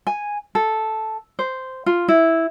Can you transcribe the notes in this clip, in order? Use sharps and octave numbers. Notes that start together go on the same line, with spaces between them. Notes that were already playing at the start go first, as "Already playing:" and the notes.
G#5
A4
C5
F4
E4